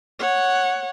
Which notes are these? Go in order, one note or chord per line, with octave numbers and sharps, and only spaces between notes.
C#5 F#5